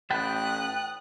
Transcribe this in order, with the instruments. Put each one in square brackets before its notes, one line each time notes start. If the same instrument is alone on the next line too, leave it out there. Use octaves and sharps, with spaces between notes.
[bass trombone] A1 [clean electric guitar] B4 A5 [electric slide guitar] G5 [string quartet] D#6 F#6